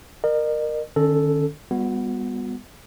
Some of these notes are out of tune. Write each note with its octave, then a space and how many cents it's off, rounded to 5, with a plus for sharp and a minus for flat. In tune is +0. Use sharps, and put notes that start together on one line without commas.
A#4 +0 D#5 -45
D#3 -45 C#4 +0 A4 +0
G3 +30 B3 +0 F#4 -40